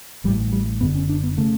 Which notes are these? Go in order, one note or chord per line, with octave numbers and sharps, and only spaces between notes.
A1 A2 G3
G3
F#1 F#2 D3 B3
C#4
D4
B3
C#3 A3